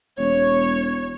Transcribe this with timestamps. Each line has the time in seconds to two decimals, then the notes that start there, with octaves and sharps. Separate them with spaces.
0.18 E1 C#5